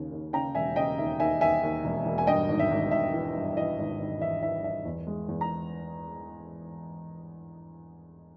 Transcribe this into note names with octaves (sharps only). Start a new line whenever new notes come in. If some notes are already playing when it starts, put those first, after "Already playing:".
Already playing: D#2 C#3
D#2
C#3 G5 A#5
E1 E5 G#5
C#3 D#5 G5
D#2 E5
D#2 E5 G#5
D#2 E5 G#5
D#2
E1
E1
G#5
G2 D#5 G5
G#1
E5
G#1
G#1 E5
E3
G2
E3 D#5
G#1
G#1
E3 E5
E3 E5
E3 E5
E2
G#3
E2
A#5